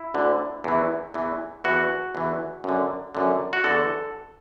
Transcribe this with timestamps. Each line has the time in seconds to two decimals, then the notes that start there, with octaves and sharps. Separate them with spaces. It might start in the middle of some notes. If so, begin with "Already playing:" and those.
Already playing: E4
0.14 D2 D3
0.64 E2 E3
1.14 E2 E3
1.64 E2 E3 F#4
2.15 E2 E3
2.64 F#2 D3
3.15 F#2 D3
3.53 F#4
3.64 E2 D3 A4